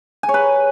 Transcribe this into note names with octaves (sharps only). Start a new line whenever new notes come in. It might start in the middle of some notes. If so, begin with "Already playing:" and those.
G#5
C#5
B4